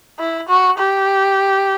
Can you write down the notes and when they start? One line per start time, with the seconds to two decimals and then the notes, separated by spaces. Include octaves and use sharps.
0.19 E4
0.49 F#4
0.79 G4